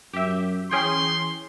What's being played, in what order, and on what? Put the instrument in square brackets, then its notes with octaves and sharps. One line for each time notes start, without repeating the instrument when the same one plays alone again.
[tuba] F#2 [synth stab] G4 E5
[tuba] E3 [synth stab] C#4 G#4 G5 [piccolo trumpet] C6